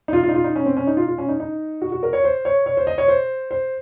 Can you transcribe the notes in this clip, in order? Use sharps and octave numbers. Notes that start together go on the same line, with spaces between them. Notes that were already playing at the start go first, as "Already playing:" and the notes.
D#4
F4
F4
D#4
F4
D#4
C#4
C4
C#4
D#4
F4
F4
C#4
D#4
D#4
F#4
F#4
A#4
C#5
C5
C#5
C#5
C5
D#5
C#5
C5
C5